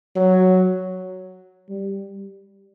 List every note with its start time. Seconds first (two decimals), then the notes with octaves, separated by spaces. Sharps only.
0.16 F#3
1.69 G3